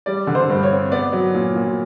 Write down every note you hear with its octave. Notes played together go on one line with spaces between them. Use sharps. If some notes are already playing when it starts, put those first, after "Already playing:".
G3 D5
D3
C5
G2
C#5
C4
B3 D5
F#3
A#2
A#2